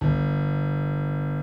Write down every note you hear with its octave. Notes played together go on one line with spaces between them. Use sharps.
G1